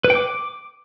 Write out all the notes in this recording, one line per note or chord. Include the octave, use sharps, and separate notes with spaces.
B4
G5
D6